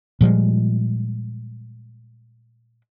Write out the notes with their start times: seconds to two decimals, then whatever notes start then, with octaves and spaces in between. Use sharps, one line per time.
0.21 A#2 F3 G3 G#3